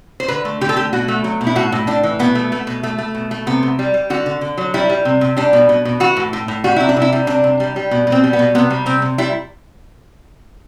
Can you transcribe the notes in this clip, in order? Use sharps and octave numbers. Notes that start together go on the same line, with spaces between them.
C5
D3 B4
A3
D3 G4
A4
A3 G4
B2 F#4
A3
F#3
B2
E4
A2 F#4
A2
A2 D4
E3
B2 B3
A3
A3
B2
A3
A3
B2
A3
C3 B3
C3
G3
G3
D3 F#4
D3
D3
F#3
G3 E4
G3
C3
C3
G3 D4
B2
B2
B2
E3 F#4
A2
A2
A2
G3 F#4
C3 E4
D4
C3
E4
G3
C3 D4
C3
G3
G3
B2
B2
C4
G3
B3
B2
C3 B3
G3
C3 C4
C3
G3 E4